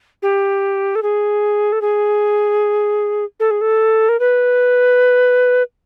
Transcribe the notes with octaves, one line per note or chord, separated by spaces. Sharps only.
G4
A4
G#4
A4
G#4
A4
G#4
A4
A#4
B4